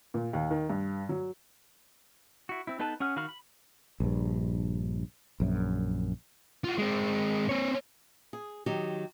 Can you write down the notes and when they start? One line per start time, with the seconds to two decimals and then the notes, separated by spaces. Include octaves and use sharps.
0.14 A#2
0.33 D#2
0.51 D#3
0.70 G2
1.09 F#3
2.49 E4 F#4
2.67 C4 E4
2.79 B3 D#4 A4 B4 A5
3.00 C#4 G#4 F#5 F6
3.16 D#3 F#4 F5 B5 F6
3.29 B5
4.00 A#1 G2
5.40 A#1 F#2
6.64 F4 F#4
6.78 G#3 C4
7.49 C4 C#5
8.33 G#4
8.66 D#3 F#3 G4